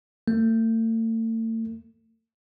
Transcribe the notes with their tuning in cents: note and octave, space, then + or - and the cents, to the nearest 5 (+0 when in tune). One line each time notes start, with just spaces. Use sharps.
A3 +40